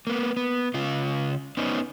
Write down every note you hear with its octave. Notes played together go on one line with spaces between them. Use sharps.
A#3 B3
B3
C#3 F4
B3 C#4 D#4